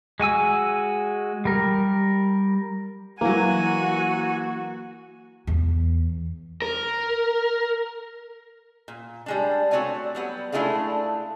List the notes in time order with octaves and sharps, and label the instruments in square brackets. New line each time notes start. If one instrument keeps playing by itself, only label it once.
[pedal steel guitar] G#3 F#4 G#5 E6
G3 A#4
[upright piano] E3 F#3 [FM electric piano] A#3 [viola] F#4 [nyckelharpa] G#5
[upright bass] E2
[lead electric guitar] A#4
[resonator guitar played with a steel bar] A#2
G3 G#3 D4
A3 C4 F#4 C#5 D5 G#5
F#3 G3 B3
G#3 A3 D4 E4 F4 G#4